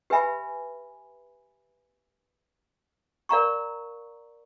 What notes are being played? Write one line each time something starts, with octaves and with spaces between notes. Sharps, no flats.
G4 B4 E5 G#5 B5
A#4 D5 F5 A#5 C#6